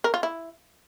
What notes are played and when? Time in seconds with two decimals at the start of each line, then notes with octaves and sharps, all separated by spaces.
0.04 A#4
0.14 F4
0.23 E4